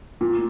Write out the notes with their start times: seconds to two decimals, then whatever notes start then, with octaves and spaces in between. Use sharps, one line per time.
0.21 A#2